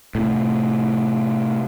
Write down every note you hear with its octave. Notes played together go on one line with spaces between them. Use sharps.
A2 C3